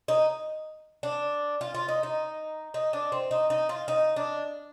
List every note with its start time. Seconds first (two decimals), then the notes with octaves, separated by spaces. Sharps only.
0.08 D#4
1.03 D4
1.61 F4
1.75 F4
1.88 D#4
2.03 D#4
2.74 D#4
2.93 D4
3.12 C4
3.31 D#4
3.50 D#4
3.69 F4
3.88 D#4
4.16 D4